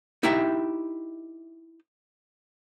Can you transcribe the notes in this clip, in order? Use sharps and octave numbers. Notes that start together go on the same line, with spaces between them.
D#4 E4 G4 E5 G5